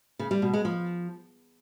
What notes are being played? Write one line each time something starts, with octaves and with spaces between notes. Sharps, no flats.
C#3
G3
B2
G#3
F3